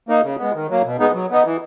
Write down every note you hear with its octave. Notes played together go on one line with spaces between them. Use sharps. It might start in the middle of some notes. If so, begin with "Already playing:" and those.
A#3 D#4
C#3
G#3 B3
D#3
F#3 A#3
B2
G#3 B3 D#4
F#3
B3 D#4
E3